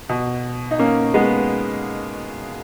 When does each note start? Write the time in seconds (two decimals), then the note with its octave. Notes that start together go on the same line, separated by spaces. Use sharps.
0.09 B2
0.71 D#4
0.79 A#3 C#4
1.14 G#3 B3